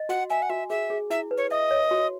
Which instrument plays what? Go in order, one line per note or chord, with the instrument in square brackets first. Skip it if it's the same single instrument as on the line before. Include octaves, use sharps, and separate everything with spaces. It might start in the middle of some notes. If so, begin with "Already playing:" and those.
Already playing: [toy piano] D#5
[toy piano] F#4 [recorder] F#5
[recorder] E5 [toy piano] G#5
[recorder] F#5
[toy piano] F#4 [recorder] E5
[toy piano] G#4 [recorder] E5
[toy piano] G#4
[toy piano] E4 [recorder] E5
[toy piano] B4
[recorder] C#5
[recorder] D#5 [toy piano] E5
[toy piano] C#5
F#4